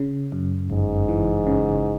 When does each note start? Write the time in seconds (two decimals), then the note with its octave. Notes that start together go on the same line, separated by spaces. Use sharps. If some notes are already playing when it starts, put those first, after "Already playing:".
Already playing: C#3
0.32 F#2
0.70 G1 G#2
1.09 E3
1.47 C#3